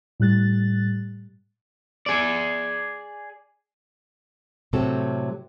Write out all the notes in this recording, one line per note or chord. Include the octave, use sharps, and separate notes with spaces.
A2 G3 F#6 A6
G#4 D5
A2 C3 F#3 A3 C4 A4